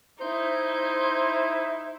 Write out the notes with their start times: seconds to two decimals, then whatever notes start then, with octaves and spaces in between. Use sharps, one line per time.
0.21 D#4 E4 C5